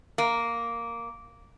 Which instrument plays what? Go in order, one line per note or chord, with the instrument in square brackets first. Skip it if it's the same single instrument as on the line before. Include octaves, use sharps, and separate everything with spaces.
[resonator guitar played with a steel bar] A#3